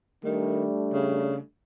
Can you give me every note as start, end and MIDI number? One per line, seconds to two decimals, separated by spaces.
0.24 0.66 51
0.24 1.42 55
0.24 1.42 57
0.24 1.42 62
0.93 1.37 49